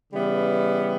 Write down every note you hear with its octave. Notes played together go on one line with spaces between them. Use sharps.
C#3 E3 G3 B3